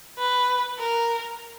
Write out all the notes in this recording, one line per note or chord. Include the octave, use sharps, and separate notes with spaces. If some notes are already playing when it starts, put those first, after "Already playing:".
B4
A#4